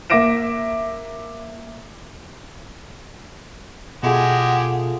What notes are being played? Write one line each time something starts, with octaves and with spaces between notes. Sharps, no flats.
A#3 E5 D6 A#6 D7 E7
B2 G#3 A3 F4 G4 G#4 F#5